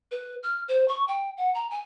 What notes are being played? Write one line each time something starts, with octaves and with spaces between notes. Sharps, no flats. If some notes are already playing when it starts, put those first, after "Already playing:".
B4
F6
C5
C#6
G5
F#5
A#5
G#5